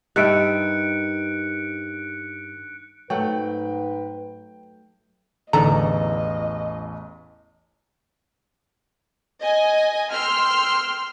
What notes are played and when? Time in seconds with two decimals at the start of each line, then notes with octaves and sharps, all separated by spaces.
0.16 G2 D#3 E5 F#6 C#7 D7
3.10 G#2 F#3 A3 B4 F#5 G5
5.53 A1 E2 D3 D#3 A4 D#5 A#5
9.41 D#5 G#5
10.11 G5 C6 E6 F6